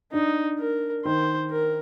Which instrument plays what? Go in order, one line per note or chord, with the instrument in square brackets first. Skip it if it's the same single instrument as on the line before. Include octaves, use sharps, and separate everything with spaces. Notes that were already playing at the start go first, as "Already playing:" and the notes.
[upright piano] D4 [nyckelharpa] D#4
[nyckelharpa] A#4
[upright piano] D#3 [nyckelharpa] C5
[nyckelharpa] A#4